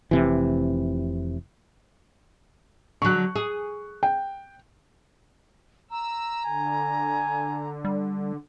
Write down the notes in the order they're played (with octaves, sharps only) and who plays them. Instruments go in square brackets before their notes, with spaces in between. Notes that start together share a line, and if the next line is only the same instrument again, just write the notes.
[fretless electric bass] F1 C3 E3
[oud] D3 F#3 [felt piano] C#6 F#6
[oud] G#4
[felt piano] G5
[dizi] A#5 [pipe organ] E6
[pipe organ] D3 [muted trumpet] G#5
[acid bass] G3